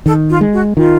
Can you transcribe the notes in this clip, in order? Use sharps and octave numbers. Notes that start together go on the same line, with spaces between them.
D#3 A4
F4
G#3
F#4
D#3 F4